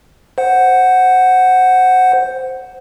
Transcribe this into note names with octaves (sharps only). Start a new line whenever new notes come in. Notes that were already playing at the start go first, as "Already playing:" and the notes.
C5 F#5